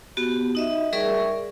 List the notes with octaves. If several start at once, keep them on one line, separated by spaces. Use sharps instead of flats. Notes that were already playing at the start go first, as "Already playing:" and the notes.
B3 F#4 G4
D#4 D#5 E5
G3 G#4 A#4 D5 E5 C#6